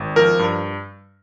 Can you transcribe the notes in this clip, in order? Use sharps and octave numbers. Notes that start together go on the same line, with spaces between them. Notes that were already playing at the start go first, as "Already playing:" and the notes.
Already playing: G#1
F3 A#4
G2